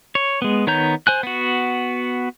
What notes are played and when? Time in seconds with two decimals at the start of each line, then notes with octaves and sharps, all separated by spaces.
0.15 C#5
0.42 G#3 B3
0.67 D#3 B3 C#5 A#5 G6
1.07 C5 G#5 F#6
1.23 B3 F#4